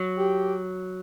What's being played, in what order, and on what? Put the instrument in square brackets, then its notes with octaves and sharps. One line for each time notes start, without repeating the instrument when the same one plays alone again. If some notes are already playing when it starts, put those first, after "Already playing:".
Already playing: [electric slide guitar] F#3
[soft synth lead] G4